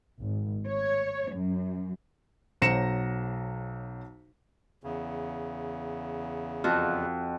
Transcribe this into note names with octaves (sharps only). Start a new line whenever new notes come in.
G#1
C#5
F#2
B1 F#3 C5 A#6 C#7 E7
E2 C#3
F2 F4 F#4